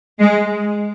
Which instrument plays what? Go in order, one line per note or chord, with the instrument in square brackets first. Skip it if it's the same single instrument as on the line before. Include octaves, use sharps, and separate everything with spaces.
[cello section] G#3